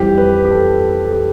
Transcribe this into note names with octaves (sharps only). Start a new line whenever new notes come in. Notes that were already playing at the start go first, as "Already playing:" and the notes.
Already playing: F2 E3 G3 G4
B4
G4
A4
A4
G4